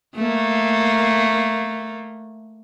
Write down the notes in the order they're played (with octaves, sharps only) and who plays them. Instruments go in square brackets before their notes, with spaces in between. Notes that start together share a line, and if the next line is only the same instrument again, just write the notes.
[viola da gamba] A3 A#3